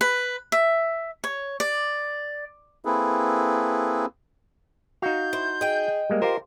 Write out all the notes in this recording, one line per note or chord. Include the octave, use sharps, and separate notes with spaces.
B4
E5
C#5
D5
A#3 C4 E4 G#4 A4 B4
D#4 F#4 F5 G6
E4 C5
G#4 D#5 G5
G3 G#3 A#3
F4 G4 A#4 C5